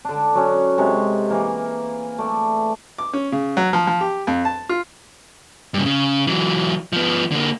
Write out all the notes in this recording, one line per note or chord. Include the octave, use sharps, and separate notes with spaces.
D3 D4
F#3 C#4
C3 G#3 C#6
E3 A#3
A3 D5
D6
C#4
C#3
F#3
F3
F3
G4
F2
A5
F4
G2 C#3
C#3
E3 F#3
F3 B3
D3 A#3